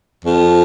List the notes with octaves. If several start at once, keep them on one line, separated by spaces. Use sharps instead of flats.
F2